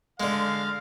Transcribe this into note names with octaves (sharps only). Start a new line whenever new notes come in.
D3 G#3 F5